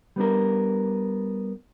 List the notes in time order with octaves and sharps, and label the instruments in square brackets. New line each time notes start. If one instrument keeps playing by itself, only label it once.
[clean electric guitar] G3 B3 D4 A#4